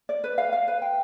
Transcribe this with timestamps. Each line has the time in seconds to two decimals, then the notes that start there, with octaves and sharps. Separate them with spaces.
0.09 D5
0.24 B4
0.38 F5
0.53 F5
0.68 B4
0.82 G5